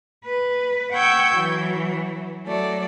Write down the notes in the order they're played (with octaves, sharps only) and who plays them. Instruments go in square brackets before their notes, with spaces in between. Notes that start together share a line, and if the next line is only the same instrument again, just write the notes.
[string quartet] B4
F#5 G5 C#6 E6 G6 G#6
E3 F#3
F#3 A3 D5